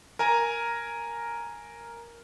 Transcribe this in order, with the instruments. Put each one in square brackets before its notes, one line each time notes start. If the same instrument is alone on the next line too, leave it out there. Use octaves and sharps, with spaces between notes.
[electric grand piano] A#4 G#5 A#5